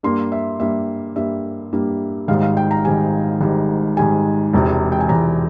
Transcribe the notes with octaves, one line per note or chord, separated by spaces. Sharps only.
G2 G3 A#3 C6
E5
G2 G3 A#3 E5
G2 G3 A#3 E5
G2 G3 A#3
G#1 G#2 G3 F5
F5
G5
A#5
G#1 G#2 G3 G#5
G#1 G#2 G3
G#1 G#2 G3 G#5
E1 E2 C3
G5
G#5
E1 E2 C3 A#5